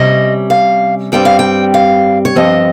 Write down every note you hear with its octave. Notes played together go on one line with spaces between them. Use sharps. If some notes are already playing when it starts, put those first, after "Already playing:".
Already playing: C3 G3 C#4 D#5
F5
G2 G3 C4 G5
F5
G5
F5
C#5
G2 F3 C4 D#5